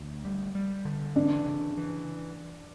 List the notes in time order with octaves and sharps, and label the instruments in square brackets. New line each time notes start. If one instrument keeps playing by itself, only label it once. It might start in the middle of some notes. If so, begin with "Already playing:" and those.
Already playing: [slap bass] D2
G3
G3
D3
[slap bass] E3 [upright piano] D4
[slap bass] C#3
E3